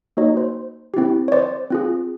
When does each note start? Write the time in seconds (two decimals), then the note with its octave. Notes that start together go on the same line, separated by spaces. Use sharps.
0.17 A#3 D#4 F#4 C#5 D#5
0.37 C5
0.94 C4 E4 G4
1.28 C#5
1.32 C5 D5
1.70 C4 F4 G#4